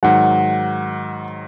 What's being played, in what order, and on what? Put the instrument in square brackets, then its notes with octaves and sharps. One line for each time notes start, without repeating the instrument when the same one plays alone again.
[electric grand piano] G#2 D#3 F#3 [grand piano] F#5